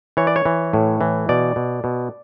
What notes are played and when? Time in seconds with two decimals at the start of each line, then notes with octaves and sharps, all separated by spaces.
0.17 E3 C#5
0.27 D5
0.36 C#5
0.45 E3
0.73 A2
1.01 E3
1.29 B2 D5
1.56 B2
1.84 B2